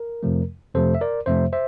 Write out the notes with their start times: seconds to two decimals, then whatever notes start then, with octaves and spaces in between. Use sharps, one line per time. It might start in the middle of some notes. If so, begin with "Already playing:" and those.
Already playing: A#4
0.23 F2 C3 F3 A3
0.75 F2 C3 F3 A3 A4 C5
0.95 E5
1.01 A#4 D5
1.26 F2 C3 F3 A3 C5 E5
1.53 C5 E5